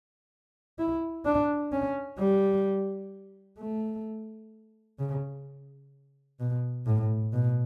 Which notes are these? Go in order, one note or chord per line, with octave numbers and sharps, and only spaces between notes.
E4
D4
C#4
G3
A3
C#3
B2
A2
B2